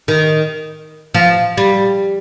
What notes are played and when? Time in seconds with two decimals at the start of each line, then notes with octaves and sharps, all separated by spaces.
0.08 D#3
1.15 F3
1.57 G3